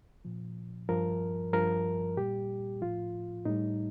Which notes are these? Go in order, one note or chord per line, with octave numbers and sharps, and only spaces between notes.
A#2 F3
G2 F3 A#4
G2 F3 A#4
A#2 G3 G4
A2 F3 F4
A2 G3 D#4